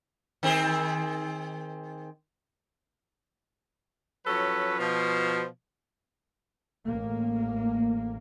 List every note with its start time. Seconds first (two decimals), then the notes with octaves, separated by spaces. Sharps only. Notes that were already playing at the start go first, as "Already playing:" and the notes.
0.43 D#3 C4 G#4
4.26 F3 F#3 C#4 A4 B4
4.79 B2 F3
6.87 A1 A#3